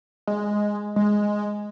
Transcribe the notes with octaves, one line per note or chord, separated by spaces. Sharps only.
G#3
G#3